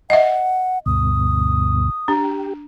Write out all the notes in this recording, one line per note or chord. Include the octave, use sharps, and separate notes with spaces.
D#5 E5 F#5
D2 G2 B2 D#6
D4 G4